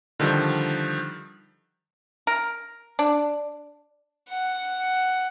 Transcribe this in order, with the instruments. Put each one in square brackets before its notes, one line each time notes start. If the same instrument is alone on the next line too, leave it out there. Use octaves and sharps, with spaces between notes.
[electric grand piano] D3 D#3 F3 G3
[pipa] A#4
D4
[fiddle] F#5